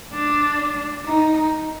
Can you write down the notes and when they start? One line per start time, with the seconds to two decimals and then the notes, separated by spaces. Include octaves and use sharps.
0.14 D4
1.06 D#4